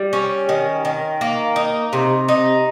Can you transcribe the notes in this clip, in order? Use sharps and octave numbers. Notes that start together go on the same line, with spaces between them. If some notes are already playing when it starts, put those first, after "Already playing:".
Already playing: G3
C#4
D#3
D#3
A#3
D#4
C3
D#4